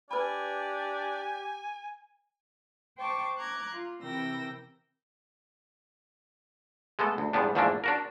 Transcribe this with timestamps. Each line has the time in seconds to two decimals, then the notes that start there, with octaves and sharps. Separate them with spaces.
0.11 D4 G4 B4 G#5 B5
2.97 C5 G5 A5 C#6 D6
3.38 A#5 D6 F#6 G#6
3.71 F4
4.03 C3 E3 A#4 G5 E6 A#6
6.99 G#3 A3 B3 A4
7.18 D2
7.33 E2 G#2 G3 B3 D4
7.55 E2 G#2 F3 A3 A#3 D4
7.84 D4 F#4 A#4